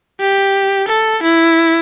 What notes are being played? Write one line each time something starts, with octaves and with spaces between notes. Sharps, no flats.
G4
A4
E4